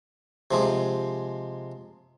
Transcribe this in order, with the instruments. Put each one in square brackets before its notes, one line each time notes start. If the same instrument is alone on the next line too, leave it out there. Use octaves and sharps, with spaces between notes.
[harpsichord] C3 F3 G#3